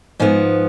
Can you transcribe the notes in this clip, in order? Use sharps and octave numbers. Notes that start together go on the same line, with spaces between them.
G#2 F3 B3